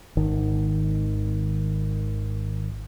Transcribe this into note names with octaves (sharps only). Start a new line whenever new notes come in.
G#1 D#3